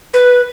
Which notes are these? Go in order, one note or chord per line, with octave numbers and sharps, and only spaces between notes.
B4